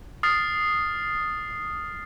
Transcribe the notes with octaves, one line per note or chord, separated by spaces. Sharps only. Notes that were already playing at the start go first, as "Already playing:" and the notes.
D#6 F6 A6 C7